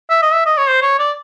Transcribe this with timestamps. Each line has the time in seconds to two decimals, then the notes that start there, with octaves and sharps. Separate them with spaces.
0.10 E5
0.22 D#5
0.33 E5
0.46 D#5
0.58 C#5
0.69 C5
0.82 C#5
0.99 D5